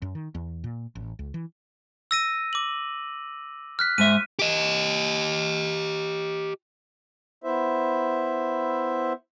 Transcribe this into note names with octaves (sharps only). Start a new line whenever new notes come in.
F#2
D#3
E2
A#2
A1
C#2
E3
E6 A#6 D#7
D6 F#7
F6 F#6 B6
G#2 G#3 E5 D#7
G4 D#5
B3 E4 C5 E5